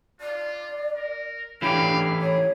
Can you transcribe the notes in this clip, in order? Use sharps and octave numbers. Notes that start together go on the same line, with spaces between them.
F4 D5
A#4
E3 A3 D4 G4 F5
G#4 C#5